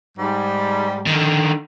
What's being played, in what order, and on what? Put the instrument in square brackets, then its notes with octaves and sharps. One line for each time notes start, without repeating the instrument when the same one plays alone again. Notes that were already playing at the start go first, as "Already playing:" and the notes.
[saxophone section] G#2 G3
[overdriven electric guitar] D3 D#3